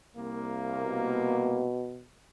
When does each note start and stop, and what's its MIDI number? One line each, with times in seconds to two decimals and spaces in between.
0.16 1.66 36
0.16 1.66 58
0.81 2.05 47